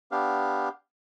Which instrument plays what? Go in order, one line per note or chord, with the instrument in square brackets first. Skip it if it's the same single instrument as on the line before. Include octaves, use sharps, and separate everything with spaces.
[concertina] B3 D4 G4 F5